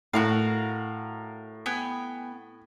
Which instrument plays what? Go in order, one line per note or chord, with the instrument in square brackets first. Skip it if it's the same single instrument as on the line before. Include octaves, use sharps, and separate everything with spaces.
[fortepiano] A2 [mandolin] F#4 A#4 F5
[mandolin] B3 G5 G#5